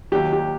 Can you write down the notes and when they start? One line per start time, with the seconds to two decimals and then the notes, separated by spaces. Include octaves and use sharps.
0.12 D#2 D#3 F#3 G4
0.33 G4